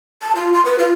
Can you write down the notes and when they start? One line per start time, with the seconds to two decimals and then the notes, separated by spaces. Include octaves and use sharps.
0.22 A5
0.35 F4
0.54 C6
0.65 B4
0.79 F4